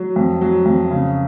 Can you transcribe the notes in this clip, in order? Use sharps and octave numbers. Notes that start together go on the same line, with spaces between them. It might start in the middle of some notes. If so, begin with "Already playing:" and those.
Already playing: F#3
F2
F#3
F2
C#3